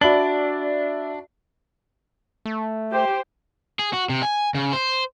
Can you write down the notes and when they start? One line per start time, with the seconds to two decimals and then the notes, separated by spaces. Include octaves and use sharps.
0.01 D4 F#4 D5 E5 B5 F#7
2.45 A3
2.91 G4 C5 G5
3.79 G#4
3.93 F#4
4.09 C3
4.23 G#5
4.55 C#3
4.73 C5